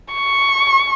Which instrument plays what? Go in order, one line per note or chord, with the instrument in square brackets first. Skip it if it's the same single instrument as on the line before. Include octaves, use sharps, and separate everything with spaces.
[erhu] C#6